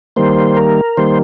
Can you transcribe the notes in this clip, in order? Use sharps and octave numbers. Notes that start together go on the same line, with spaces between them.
D#3 G3 A#3 C5
A#4
D#3 G3 A#3 C5